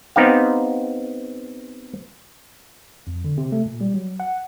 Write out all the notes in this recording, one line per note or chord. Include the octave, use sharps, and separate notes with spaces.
B3 C4 D#4 G4 F5
F2
D3
C3
A3
A#2
G3
F#3
F#5